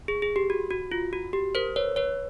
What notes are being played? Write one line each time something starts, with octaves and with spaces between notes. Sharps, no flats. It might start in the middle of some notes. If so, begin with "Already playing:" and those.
G#4
G#4
G4
F#4
F#4
F4
F#4
G4
A#4 C5
B4 C#5
B4 C#5